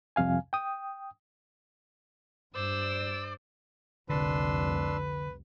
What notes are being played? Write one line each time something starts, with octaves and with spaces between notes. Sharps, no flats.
C2 F2 C3 F5 G#5
G5 D#6
G2 C5 D5 E6
F1 C2 D3 D4 B4 C6 E6